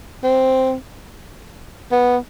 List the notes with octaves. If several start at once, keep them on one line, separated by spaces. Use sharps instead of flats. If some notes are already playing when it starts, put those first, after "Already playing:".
C4
B3